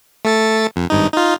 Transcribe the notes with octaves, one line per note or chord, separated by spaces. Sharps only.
A3 A4 A6
F2
G#1 G2 D#4
D#4 F4